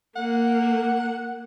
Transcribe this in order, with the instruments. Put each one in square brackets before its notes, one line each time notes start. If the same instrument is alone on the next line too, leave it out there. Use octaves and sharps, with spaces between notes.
[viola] A#3 [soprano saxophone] F#5